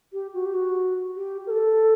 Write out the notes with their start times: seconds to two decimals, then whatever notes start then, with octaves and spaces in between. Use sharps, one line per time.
0.13 G4
0.34 F#4
0.46 G4
0.54 F#4
1.16 G4
1.47 A#4
1.50 A4